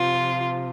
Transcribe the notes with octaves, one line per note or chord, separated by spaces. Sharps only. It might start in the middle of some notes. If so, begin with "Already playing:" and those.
Already playing: C3 F3 F4